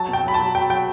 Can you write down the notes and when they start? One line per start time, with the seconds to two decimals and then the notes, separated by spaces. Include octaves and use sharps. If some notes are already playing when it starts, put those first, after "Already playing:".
Already playing: F#3 A5
0.08 B2 G5
0.24 F#3 B5
0.34 A5
0.39 F#3
0.55 F#3 G5
0.70 F#3 G5